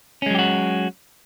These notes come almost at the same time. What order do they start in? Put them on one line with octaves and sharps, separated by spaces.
C#4 G#3 F#3 G4 F#4